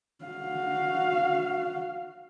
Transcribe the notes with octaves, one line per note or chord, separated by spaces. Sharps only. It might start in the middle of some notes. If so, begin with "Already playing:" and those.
F#4 F5